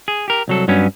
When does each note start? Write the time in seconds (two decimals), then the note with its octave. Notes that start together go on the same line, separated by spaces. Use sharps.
0.08 G#4
0.28 G4 A#4
0.48 C2 F#3 A4
0.68 G2 F#3 B3 C#4